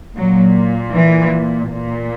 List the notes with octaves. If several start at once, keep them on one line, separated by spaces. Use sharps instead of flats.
A#2 F#3
E3
A#2